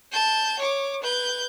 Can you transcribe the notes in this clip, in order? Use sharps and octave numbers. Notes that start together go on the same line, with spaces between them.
A5 G6
C#5 D6
B4 G6